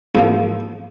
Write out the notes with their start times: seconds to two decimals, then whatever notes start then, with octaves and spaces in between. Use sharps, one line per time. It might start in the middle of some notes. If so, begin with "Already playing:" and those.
0.15 G#2 F3 A#3 E4